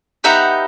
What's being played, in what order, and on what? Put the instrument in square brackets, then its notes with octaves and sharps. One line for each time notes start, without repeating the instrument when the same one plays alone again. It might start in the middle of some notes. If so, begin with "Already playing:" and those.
[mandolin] B3 D#4 G4 E5 F#5